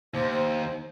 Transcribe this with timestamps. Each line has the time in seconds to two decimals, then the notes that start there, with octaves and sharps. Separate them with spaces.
0.14 D#2 C5
0.31 C5